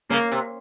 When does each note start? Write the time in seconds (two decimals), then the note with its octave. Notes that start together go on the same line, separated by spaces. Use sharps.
0.10 C#3 A#3
0.32 C3